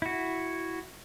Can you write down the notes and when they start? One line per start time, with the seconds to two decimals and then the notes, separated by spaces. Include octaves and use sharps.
0.02 E4 F#4